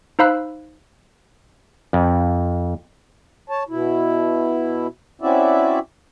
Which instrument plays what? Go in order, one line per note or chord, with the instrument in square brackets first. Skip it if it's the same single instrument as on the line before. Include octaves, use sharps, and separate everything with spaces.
[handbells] D#4 C5 F5 B5 E6 F#6
[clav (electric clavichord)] F2
[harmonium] C#5 A5
B2 E4
C4 C#4 E4 F#4 D5 E5